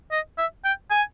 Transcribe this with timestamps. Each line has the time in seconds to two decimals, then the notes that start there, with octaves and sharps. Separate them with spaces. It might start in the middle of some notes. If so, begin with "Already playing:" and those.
0.12 D#5
0.38 E5
0.65 G5
0.91 G#5